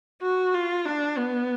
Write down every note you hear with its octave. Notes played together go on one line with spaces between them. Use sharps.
F#4
F4
D4
B3